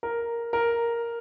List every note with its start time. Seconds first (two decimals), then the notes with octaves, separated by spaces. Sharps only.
0.03 A#4
0.53 A#4